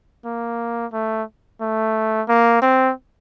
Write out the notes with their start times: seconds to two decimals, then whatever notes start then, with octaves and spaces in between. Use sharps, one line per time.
0.25 A#3
0.92 A3
1.61 A3
2.29 A#3
2.62 C4